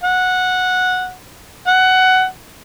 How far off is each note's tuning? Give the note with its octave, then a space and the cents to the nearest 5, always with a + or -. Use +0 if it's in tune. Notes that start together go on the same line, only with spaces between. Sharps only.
F#5 -10
F#5 +15